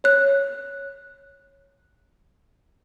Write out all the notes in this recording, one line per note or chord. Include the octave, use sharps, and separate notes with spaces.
C#5 F#6